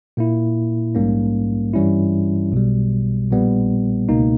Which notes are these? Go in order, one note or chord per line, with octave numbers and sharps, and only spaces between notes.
A#2 A#3 E4
A#1 G#2 G3 A#3 C#4
G2 E3 G3 C#4 E4
B1 B2 G3
A#1 A#2 G3 B3
C#2 B2 A#3 D#4